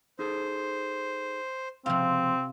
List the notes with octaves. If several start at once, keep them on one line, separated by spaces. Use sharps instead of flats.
D#4 G#4 A4 C5
C#2 C3 F3 C4 F4